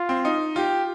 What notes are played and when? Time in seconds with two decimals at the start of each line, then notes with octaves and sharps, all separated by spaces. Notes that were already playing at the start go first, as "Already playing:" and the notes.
Already playing: F4
0.09 C4
0.25 D#4
0.56 F4 G4